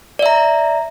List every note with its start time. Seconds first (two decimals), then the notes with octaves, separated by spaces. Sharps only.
0.19 D5
0.23 E5
0.26 A#5